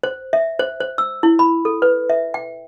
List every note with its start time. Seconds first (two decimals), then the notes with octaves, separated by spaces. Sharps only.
0.03 C5
0.33 E5
0.59 C5
0.80 C5
0.98 E6
1.23 E4
1.39 B5
1.65 A4
1.82 B4
2.10 E5
2.34 G5